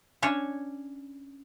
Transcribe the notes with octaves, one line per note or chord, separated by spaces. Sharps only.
C#4 D4 C#5